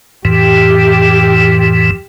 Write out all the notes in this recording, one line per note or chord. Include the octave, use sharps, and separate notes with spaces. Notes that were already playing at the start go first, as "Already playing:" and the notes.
F2 A2 E3 G4